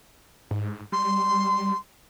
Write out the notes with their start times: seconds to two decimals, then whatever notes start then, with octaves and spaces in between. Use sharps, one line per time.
0.51 G#2
0.92 G3 C6